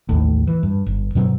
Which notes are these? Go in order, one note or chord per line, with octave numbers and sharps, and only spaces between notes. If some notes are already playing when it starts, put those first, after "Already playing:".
A1 D#2 A2
E3
G2
G1
G2 B2 F#3 C4